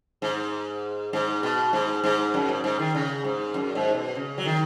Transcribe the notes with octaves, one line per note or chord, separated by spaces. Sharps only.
G#2
G#2
B2
G#2
G#2
F#2
G#2
G#2
D#3
C#3
G#2
F#2
G#2
B2
C#3
F#3
D#3